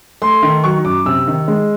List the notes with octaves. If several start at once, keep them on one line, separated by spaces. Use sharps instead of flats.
A3 C6
D#3
F#3 C#6
F#2 D6
C3 E6
D#3
G#3